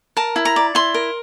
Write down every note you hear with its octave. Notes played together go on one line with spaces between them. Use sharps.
A#4 A5
E4
A#5
D5
E4 C6
A#4